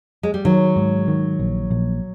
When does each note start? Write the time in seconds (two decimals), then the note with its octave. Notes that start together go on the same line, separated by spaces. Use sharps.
0.23 G#3
0.34 G3
0.45 D#3 F#3
0.76 G#2
1.08 D#3
1.39 A#1
1.71 A#1